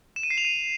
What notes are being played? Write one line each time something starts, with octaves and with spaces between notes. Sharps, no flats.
E7
D#7
C7
F7
D#7